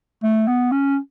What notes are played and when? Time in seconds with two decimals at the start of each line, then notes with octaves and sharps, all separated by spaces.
0.23 A3
0.48 B3
0.72 C#4